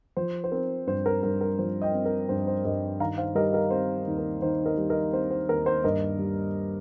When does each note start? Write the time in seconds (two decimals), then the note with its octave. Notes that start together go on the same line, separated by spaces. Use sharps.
0.17 F3 C5
0.44 C5
0.52 C4 A#4
0.87 G2 C5
1.06 A#4
1.23 G2 A#4
1.41 A#4
1.59 F3 C5
1.82 D#5 G5
1.94 C4
2.06 A#4
2.29 G2 C5
2.47 C5
2.64 G2 A#4 D#5
3.00 D#3 F5 A#5
3.18 C5 F5
3.35 G3 A#4 D#5
3.53 A#4 D#5
3.71 C4 C5
4.07 D#2
4.18 A#4
4.42 D#3 C5
4.66 A#4 D#5
4.77 G3
4.90 A#4 D#5
5.13 C4 C5
5.31 C5
5.48 D#2 A#4
5.66 C5
5.84 G2 A#4 D#5
6.19 G3